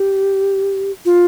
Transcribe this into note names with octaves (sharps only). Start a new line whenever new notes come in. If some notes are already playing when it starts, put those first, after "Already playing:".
Already playing: G4
F4